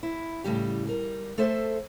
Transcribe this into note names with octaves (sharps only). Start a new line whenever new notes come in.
E4
A2 C#3 G3 G4
G3 A#4
A3 A4 C5 E5